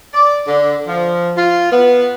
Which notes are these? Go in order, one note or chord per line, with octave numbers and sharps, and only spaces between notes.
D5
D3
F3
F4
B3